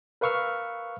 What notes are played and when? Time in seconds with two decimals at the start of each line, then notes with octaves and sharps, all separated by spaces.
0.21 A#4 B4 F5 C#6 E6 F6